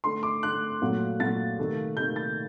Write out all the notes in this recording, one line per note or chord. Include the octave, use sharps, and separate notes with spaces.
D3 A3 C6
D6
D3 A3 F#6
A#2 F#3 A3
A#2 F#3 A3 A6
C3 D#3 A3
C3 D#3 A3 G6
A6